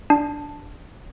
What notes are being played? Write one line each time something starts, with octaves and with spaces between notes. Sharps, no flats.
D4